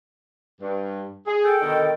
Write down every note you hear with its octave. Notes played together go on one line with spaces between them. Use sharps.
G2
G#4
A4 G5
B2 D3 D#3